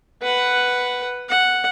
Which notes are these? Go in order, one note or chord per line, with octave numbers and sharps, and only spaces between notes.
B4 F#5
F#5